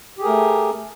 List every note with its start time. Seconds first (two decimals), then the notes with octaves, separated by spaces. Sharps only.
0.18 G4
0.21 G#4
0.24 A#4
0.27 A3